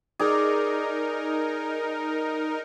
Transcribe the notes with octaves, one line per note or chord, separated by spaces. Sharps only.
D#4 G#4 A#4 D5